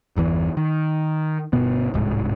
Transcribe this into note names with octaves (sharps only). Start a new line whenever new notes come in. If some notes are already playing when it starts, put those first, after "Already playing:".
G1 E2 E3
D#3
G1 B2 B3
D1 C2 G#2